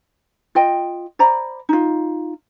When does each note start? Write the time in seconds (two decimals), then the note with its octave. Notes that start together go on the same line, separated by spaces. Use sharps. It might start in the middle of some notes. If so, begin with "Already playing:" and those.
0.55 F4 D#5 G5
1.19 C5 D5 A#5 B5
1.69 D#4 F4